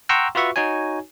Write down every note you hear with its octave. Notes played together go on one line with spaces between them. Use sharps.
F#5 G5 A#5 C6 C#6 E6
F4 F#4 B4 E5 C#6
D#4 F#4 C#5 G#5